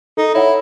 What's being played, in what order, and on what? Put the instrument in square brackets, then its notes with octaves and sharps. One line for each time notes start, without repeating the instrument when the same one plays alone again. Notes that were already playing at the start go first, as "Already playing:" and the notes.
[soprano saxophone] D#4 [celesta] A4
[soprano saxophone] E4 [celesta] C#5 F#5